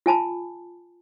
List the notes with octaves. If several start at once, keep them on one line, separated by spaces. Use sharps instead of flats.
F4 G#5 A5 B5